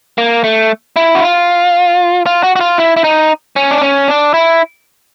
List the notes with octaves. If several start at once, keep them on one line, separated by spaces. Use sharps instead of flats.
A#3
A3
E4
F#4
F4
F4
F#4
F#4
F4
E4
E4
D#4
C#4
D4
C#4
D4
E4